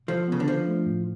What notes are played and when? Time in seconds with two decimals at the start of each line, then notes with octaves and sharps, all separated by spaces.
0.08 F3 A4
0.28 C#3 B3
0.40 D3
0.47 F3 D4
0.67 A3
0.86 A2